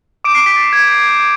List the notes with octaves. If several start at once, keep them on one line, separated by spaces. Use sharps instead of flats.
D6 D#6 G6 D7
C7
B6
A6
G#6
G6
G#6